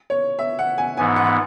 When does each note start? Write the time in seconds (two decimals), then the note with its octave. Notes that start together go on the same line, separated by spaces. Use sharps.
0.10 C#5
0.39 E5
0.59 F#5
0.78 G#5
0.97 G#2 E3 B3 G#5
1.16 F#5